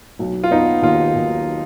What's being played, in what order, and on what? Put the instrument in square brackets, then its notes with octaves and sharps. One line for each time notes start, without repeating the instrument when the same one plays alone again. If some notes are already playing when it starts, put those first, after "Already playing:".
[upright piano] B1
[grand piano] F4
[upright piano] B3 [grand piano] D#4
[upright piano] D#2 [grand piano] F4
[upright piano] D#2